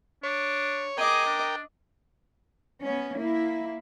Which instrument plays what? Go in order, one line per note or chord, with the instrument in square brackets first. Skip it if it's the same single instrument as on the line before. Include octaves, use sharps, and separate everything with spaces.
[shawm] D4 [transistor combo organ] C#5
[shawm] G#4 [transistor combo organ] A#4 G5 [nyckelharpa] D#5 D6
[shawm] D4
[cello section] B3 C#4
A#3 E4